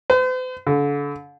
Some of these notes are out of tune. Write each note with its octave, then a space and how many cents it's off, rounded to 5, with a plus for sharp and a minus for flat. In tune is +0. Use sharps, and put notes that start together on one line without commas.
C5 -45
D3 -35